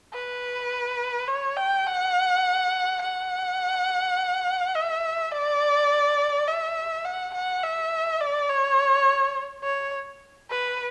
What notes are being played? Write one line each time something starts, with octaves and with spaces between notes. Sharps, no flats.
B4
C#5
G5
F#5
F#5
E5
D5
E5
F#5
F#5
E5
D5
C#5
C#5
B4